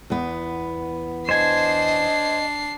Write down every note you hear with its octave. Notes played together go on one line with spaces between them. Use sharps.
E2 B3
D4 C5 D#5 G#5 C7